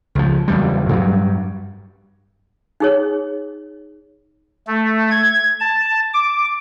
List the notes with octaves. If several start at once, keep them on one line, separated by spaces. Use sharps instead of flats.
C#2 F3
F#1 E2 G3
G2 F#3 G3
D#4 G#4 C#5
A3
G#6
A5
D6